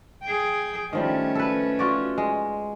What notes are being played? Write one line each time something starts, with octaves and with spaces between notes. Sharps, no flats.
G#4 G5
D#3 F3 G3 A3 C#4
A4 B4
F4 F#4 D5
G#3